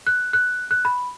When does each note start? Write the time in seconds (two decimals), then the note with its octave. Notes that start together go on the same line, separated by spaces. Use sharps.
0.07 F#6
0.33 F#6
0.71 F#6
0.85 B5